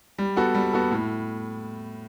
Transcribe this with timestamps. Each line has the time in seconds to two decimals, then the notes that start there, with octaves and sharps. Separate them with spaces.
0.18 G3
0.37 B3 F#4 A4
0.55 G3
0.73 B3 F#4 A4
0.91 A2